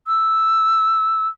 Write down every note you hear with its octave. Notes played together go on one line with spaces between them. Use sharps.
E6